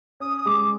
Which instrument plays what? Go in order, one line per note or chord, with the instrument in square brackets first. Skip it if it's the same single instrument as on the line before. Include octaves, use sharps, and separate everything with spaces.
[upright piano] C#4 [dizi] D#6
[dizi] D#6
[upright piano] G#3 [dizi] D6